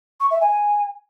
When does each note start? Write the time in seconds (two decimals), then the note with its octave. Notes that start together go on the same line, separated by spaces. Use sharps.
0.20 C#6
0.31 E5
0.41 G#5